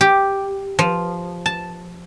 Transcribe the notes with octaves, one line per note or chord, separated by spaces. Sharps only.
G4
F3
A5